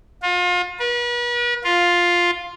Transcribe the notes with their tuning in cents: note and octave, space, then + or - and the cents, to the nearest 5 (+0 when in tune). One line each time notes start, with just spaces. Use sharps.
F4 +35
B4 -40
F4 +5